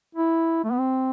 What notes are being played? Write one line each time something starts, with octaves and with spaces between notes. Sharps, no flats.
E4
A3
B3
C4